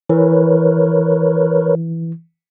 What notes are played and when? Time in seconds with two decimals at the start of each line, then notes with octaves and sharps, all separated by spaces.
0.10 E3 A#4 B4 C#5